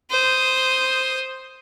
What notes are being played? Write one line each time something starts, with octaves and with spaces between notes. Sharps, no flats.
C5 D#6